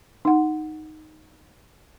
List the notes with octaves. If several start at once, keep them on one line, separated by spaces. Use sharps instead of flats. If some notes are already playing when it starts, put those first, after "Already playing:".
D#4 F#5